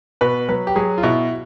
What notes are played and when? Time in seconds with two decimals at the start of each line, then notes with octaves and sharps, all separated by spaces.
0.21 B2 B4
0.48 F#3 B4
0.67 G4
0.76 F#3 G#4
0.98 F4
1.03 B2 E4